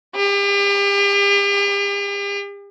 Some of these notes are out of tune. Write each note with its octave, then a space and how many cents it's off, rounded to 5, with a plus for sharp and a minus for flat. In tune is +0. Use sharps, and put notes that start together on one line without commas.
G4 +40